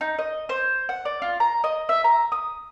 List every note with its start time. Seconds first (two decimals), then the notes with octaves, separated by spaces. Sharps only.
0.01 D#4
0.19 D#5
0.49 C5
0.89 F#5
1.05 D5
1.22 F4
1.40 A#5
1.64 D#5
1.89 E5
2.04 A#5
2.32 D#6